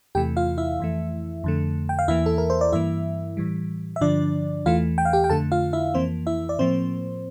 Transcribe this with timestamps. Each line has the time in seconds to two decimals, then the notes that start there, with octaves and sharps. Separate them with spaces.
0.15 E2 C3 E3 A3 G4 G5
0.37 F4 F5
0.58 E4 E5
0.80 F2 E3 A3
1.44 F2 D3 A3
1.89 G5
1.99 F5
2.08 E2 E3 A#3 E4 E5
2.26 A4
2.38 A#4
2.50 C5
2.61 D5
2.72 G2 E3 A#3 E4 E5
3.37 A2 E3 G3
3.96 E5
4.01 G2 D3 F3 D4 D5
4.66 E2 E3 A3 F4 F5
4.98 G5
5.05 F5
5.13 G4 G5
5.24 G5
5.30 F2 D3 A3 A4 A5
5.52 F4 F5
5.73 E4 E5
5.94 F2 E3 A#3 C4 C5
6.27 E4 E5
6.49 D5
6.59 A2 F3 A#3 C4 C5